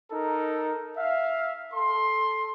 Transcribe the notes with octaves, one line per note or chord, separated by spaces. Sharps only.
D#4 A4 A#4
E5 F5
A4 C6